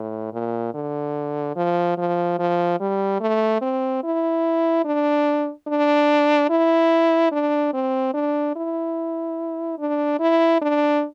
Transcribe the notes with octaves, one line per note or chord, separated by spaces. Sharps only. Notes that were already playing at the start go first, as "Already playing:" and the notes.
Already playing: A2
A#2
D3
F3
F3
F3
G3
A3
C4
E4
D4
D4
E4
D4
C4
D4
E4
D4
E4
D4